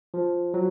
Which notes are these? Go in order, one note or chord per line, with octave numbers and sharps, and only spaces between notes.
F3
F#3